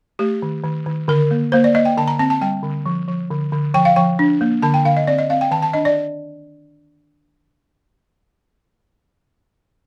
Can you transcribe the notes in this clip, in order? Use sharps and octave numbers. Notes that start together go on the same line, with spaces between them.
A3 G4
D#3
D#3
D#3
D3 A#4
A#3
A#3 C5
D5
A#3 D#5
G5
D3 A5
A#5
C4 A5
A5
G3 G5
D3
F3
F3
D3
D3
F3 G5
F5
F3 G5
D4
A#3
D3 A5
G5
D3 F5
D#5
C4 D5
D#5
C4 F5
G5
D#3 A5
A5
D4 D#5
D5